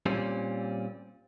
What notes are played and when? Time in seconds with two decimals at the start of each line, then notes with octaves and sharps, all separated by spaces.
0.06 A#2 G3 C4 C#4